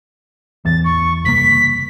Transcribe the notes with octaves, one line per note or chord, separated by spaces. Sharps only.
A1 E2 A6
C#6
F#1 C2 A#3 B6